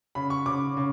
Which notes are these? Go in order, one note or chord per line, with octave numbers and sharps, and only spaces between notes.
C#3 B5
C#6
C#3 D6
C#3